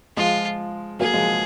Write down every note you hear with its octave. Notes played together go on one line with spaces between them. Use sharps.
F3 G#3 F4
F#3 A#3 G#4
F3 G#3